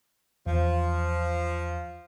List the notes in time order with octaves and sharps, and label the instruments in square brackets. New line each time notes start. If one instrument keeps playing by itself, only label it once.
[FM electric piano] E2 [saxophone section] F3